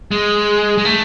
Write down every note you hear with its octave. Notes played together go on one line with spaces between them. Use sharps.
G#3
G#3
A3